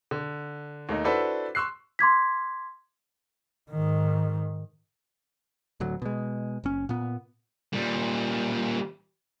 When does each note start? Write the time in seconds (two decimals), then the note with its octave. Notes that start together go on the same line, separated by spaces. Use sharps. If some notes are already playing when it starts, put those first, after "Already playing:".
0.11 D3
0.89 D#2 A3 D#4
1.05 D4 E4 F#4 A4 B4 C5
1.55 C6 C#6 E6 F#6 C7
1.99 C6 D6 G#6 B6
3.71 G#2 D#3
5.80 D1 D2 F#3
6.02 B2 G#3
6.64 F#1 C#4
6.89 A#2 B3
7.73 A#2 G3